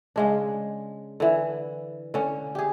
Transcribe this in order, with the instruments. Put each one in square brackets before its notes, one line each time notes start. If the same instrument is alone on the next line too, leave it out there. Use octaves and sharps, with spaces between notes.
[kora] C#3 G#3 D4
D3 E3
D3 C#4
G4 G#4